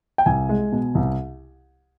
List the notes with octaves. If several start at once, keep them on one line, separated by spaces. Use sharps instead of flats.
G5
C2 G#5
G#3
B2
C2